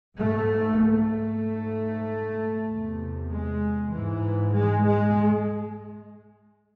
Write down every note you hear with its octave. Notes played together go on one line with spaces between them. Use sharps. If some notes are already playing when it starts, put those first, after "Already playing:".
G#2 A3
A3
G#2
E2 C3
G#3
G#2 E3
G#3
G#3